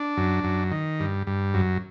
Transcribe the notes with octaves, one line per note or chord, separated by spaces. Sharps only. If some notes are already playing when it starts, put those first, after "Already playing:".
Already playing: D4
F#2
F#2
D#3
G2
G2
F#2